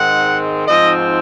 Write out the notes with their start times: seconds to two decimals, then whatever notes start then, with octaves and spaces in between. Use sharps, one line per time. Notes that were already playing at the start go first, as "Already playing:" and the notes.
Already playing: G#2 D#3 G#3 C4 F#5
0.68 G#2 F3 C4 D#4 D#5